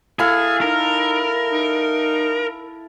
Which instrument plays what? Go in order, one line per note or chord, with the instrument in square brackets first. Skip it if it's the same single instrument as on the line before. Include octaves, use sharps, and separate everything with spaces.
[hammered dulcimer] E4 A4 F5 [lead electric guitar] G#4
[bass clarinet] D#4 [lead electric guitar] A#4
[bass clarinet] D#4